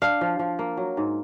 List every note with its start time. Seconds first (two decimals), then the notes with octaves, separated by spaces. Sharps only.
0.02 D4 F5
0.21 F3
0.39 F3
0.59 A#3
0.77 F#3
0.97 G#2